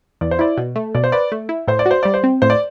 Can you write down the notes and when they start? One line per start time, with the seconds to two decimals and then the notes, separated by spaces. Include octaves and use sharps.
0.21 E2 D5
0.31 C5
0.39 E4 D5
0.57 B2
0.75 A3
0.95 B2 D5
1.04 C5
1.12 B4 D5
1.32 A3
1.49 E4
1.67 A2 C5
1.79 D5
1.86 F#4
1.91 C5
2.03 G3 D5
2.14 C5
2.24 C4
2.42 A2 C5
2.50 D5